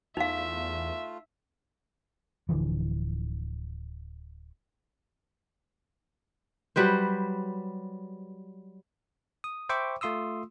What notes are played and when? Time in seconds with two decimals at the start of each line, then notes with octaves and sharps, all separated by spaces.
0.17 E2 A3 D#4 F4 E5 F5
2.49 D1 D3 E3 F3
6.76 F#3 G3 B4 C5
9.44 D#6
9.69 C5 E5 G5 B5 C#6 D6
10.01 A3 F4 C6 D#6 E6